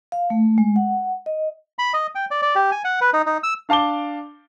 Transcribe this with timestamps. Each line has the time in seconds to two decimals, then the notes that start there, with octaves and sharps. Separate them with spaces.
0.12 F5
0.30 A3
0.58 G#3
0.76 F#5
1.26 D#5
1.79 B5
1.94 D#5
2.15 G5
2.31 D5
2.42 D5
2.56 G4
2.71 G#5
2.85 F#5
3.01 B4
3.13 D#4
3.26 D#4
3.43 E6
3.69 D4 F5 A5 D6 G7